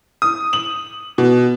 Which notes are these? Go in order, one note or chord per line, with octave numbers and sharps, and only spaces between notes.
D#6
F#7
B2